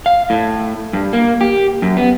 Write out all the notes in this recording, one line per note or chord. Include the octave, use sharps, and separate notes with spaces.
F5
A2
G2
A#3
G4
F#2
B3